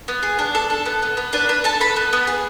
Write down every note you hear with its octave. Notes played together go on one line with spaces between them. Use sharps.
B3
G#4
D4
A4
A4
B3
B3
B3
D4 B4
D4 B4
A4 A5
A4 B5
B3
B3
G#4